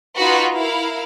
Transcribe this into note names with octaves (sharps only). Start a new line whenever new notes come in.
D#4 F4 F#4 B4
E4 A#4 F5